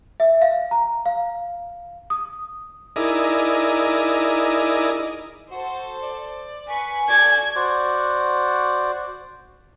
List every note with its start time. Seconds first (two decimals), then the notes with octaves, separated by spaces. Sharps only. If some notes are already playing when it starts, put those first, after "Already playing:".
0.20 E5
0.42 F5
0.71 A#5
1.06 F5
2.10 D#6
2.96 D#4 E4 G#4 A#4 D5 D#5
5.51 F#4 A4 C5
6.02 D5
6.68 B4 G#5 C#6
7.09 F#4 A4 D5 G#6
7.56 F#4 C5 D5